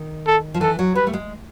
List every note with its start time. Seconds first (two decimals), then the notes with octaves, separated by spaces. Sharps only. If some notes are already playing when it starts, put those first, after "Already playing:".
Already playing: D#3
0.27 A4
0.54 F3
0.61 E3 A4
0.79 F#3
0.95 G3 B4
1.07 A3
1.13 G#3